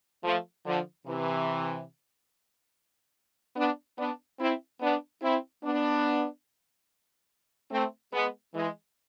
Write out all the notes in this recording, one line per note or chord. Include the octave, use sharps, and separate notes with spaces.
F3 A3
D3 F3
C3 E3
B3 D4
B3 D4
C4 E4
B3 D4
C4 E4
B3 D4
A3 C4
G#3 B3
E3 G#3